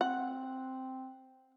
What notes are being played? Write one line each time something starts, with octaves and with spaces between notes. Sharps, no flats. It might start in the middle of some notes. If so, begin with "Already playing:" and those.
C4 F#5